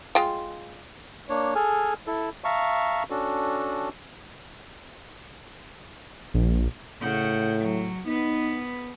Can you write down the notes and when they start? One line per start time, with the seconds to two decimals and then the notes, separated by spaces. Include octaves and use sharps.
0.15 G#3 F4 G5
1.29 A#3 D4 C#5
1.55 G#4 A4 G#5 F6
2.07 E4 A4
2.44 E5 F5 A5 A#5 C#6
3.10 C#4 D4 F#4 A4
6.34 A#1
7.01 A2 C#3 F#5 G6
7.58 F#3
8.06 B3 D#4 B4